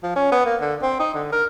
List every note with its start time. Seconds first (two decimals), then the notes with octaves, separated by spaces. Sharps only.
0.03 F3
0.16 C#4
0.32 B3
0.45 A#3
0.61 D3
0.82 C4
0.99 D#4
1.14 D3
1.33 A#4